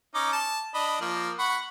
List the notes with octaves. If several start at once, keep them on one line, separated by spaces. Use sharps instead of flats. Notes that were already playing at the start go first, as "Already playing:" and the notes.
C#4 D#4 D6
A5
D4 D#5 B5
F3 A#3
F#5 B5 C#6